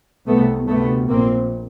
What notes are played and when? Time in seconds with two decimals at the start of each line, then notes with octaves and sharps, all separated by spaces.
0.26 C2 C3 A3 B3
0.69 D2 C3 A3 B3
1.09 A#1 A#2 A#3 C4